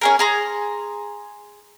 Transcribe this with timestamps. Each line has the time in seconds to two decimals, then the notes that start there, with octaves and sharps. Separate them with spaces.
0.01 C#4 G#4 A#4
0.19 G#4 A#5 C6